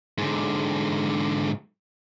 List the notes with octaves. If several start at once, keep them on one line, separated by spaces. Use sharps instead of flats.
G#2 D3